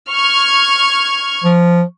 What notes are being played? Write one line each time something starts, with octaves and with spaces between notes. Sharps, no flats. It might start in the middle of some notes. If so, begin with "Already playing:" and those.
C#6 F6 G#6
F3